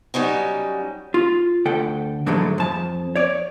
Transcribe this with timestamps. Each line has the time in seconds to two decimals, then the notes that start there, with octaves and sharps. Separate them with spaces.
0.14 F#3 G3 C#4 D#4
1.14 F4
1.65 D2 A4 F#5 G5
2.26 G#2 D3 E3 F#3 G#3 A3
2.58 F2 A5
3.16 C#5 D5